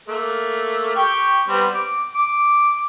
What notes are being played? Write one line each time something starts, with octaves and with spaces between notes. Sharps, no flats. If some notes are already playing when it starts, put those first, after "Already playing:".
A3 A#3
G4 G5 C#6
G3 B3 C4
D6
D6